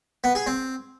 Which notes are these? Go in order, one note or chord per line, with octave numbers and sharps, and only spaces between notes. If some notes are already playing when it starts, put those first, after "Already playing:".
B3
G#4
C4